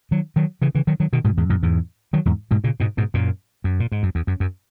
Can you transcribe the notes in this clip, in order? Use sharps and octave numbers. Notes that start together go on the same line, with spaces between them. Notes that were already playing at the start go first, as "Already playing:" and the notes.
D#3 F#3
D#3 F#3
C#3 E3
C#3 E3
D#3 F#3
D#3 F#3
B2 D#3
G#2 B2
E2 G#2
F#2 A#2
E2 G#2
D#3 F#3
E2 G#2
G#2 B2
A#2 C#3
G#2 B2
G#2 B2
F#2 A#2
F#2
A#2
G#2
F#2
E2
F#2
F#2